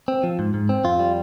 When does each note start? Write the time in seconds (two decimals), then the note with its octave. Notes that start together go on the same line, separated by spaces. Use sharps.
0.08 C4
0.24 F3
0.39 G#2
0.54 G#2
0.69 C4
0.84 F2 F4
0.99 G3